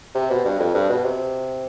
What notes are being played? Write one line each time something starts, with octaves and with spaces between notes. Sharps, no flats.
C3
B2
G2
F2
G2
B2
C3